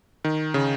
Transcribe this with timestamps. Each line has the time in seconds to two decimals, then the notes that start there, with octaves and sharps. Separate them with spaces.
0.24 D#3
0.54 C#3